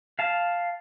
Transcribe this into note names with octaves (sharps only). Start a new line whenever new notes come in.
F5 A5